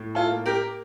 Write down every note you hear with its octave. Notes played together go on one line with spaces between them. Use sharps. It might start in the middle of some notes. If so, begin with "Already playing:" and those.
Already playing: A2
F4 A4
A#3
G4 A#4